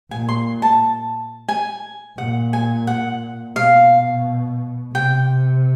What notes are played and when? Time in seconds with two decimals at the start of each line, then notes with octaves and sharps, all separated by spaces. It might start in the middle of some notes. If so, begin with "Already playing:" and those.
0.11 A#2 G#5
0.29 C6
0.62 A5
1.49 G#5
2.18 A#2 F#5
2.53 G#5
2.87 F#5
3.56 B2 F5
4.94 C3 G5